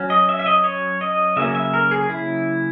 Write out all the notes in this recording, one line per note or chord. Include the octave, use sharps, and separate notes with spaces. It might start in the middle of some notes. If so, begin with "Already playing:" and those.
Already playing: F#3 C#4
D#5
E5
E5
D#5
C#5
D#5
C#3 F#3 A#3 C#4 E5
E5
A#4
G#4
E4